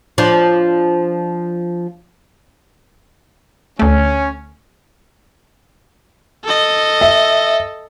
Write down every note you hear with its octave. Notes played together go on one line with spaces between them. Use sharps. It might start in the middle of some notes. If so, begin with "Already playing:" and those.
F3 D4
D2 A3 C#4
A4 D#5
E5